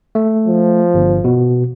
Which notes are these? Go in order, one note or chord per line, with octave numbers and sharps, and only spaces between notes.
A3
F3
G1
B2